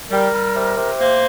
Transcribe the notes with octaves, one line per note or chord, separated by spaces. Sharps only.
G3 A#4
G3
C3
C3
A#3 C5